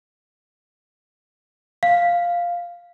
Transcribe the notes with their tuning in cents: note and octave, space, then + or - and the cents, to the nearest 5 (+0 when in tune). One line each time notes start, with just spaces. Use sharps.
F5 +0